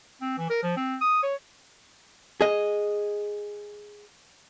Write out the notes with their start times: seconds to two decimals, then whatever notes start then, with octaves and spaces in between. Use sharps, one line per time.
0.21 C4
0.38 E3
0.50 A#4
0.63 F3
0.77 C4
1.01 D#6
1.23 C#5
2.41 G#4 D#5